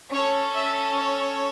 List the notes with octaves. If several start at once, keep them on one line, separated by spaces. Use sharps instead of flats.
C#4 A4 C#5
E5
C#5